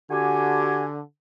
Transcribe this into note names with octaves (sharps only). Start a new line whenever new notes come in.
D3 F#4 G4 G#5